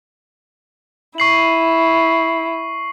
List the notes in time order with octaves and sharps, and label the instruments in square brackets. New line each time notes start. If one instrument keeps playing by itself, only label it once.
[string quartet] E4 [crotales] C#6 C7 F#7